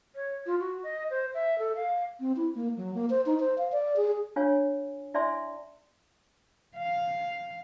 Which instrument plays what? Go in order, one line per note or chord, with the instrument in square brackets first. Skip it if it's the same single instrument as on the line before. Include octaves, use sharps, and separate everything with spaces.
[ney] C#5
F4
F#4
D#5
C5
E5
A4
F5
[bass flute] C4
E4
A#3
F#3
A#3
C5
D#4
C5
F5
D5
G#4
[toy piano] D4 F4 C#5 F5 G#5
E4 D5 E5 G#5 C6
[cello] F5